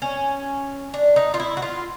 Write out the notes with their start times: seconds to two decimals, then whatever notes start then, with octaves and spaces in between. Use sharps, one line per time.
0.02 C#4
0.94 D4
1.16 D#4
1.34 F4
1.40 E4
1.57 F#4
1.62 F4